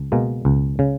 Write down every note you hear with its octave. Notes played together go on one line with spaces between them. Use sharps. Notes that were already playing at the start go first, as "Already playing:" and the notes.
Already playing: C#2
B2 G#3 A#3
C#2
C#3